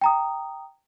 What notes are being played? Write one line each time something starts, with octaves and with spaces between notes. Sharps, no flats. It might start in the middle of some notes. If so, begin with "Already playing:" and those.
G5 A#5 D#6